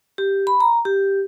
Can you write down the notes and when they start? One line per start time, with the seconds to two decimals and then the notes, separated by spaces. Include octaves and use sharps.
0.18 G4
0.47 B5
0.60 A#5
0.85 G4